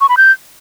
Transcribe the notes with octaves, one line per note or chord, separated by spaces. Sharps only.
C#6
B5
G6